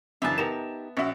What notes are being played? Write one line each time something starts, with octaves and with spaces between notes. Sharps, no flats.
F#2 C#3 E3 D4 E5 A5
B3 D#4 G4 A#4 E7
A#1 C#4 F#4 E5